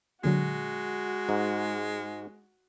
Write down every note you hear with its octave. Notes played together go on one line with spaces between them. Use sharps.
A#2 D3 F#3 G#3 F#4
G#2